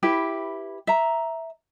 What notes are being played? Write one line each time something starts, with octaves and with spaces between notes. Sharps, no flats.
E4 G4 B4
E5 A#5